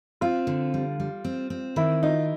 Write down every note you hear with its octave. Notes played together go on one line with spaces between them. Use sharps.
C4 F4
D3
G3
G3
C4
C4
D#3 E4
D#4 F4